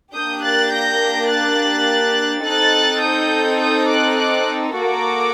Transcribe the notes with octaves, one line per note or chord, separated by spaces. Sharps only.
A#3 D4 G4 D#6 G6
F#6 A6
G6 A#6
F#6 A6
C4 D#4 A4 F#6 A6
D#6 G6
D#6 G6
D6 F#6
D6 F#6
A#3 F#4 A4 A#5 D6